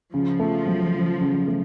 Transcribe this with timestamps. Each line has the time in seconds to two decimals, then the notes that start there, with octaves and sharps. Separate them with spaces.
0.14 C#3 F3
0.40 A3
0.66 F#3
0.94 C#3
1.21 C#3
1.48 A3